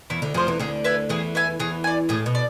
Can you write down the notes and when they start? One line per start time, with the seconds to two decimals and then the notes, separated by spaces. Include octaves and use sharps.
0.10 E2 E3 E4
0.22 D2 D3
0.34 F2 F3 G#4 C5
0.47 E2 E3
0.59 D2 D3 G#4
0.84 B4 E5 G#5
1.09 E2 E3 G#4
1.35 B4 E5 G#5
1.59 E2 E3 G#4
1.84 D5 G#5
2.09 A2 G#4
2.26 B2
2.35 D5